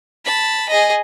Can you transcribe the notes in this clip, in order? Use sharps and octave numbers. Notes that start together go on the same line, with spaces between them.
A5 B5
G#4 D#5